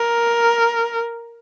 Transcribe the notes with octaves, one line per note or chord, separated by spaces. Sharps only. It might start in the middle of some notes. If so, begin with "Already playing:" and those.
Already playing: A#4